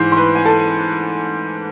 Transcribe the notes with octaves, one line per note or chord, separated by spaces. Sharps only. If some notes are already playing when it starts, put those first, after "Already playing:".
Already playing: G#2 E3 C5 C6
C6
B4 B5
G#5
A4 A5